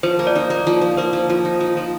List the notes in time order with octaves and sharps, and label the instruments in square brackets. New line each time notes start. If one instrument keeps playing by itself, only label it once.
[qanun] F3 [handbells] C5
[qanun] A#3
[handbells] D5
[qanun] D#4
A#3
F3
F3
[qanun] A#3 [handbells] C5
[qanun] F3
F3
D#4
F3
F3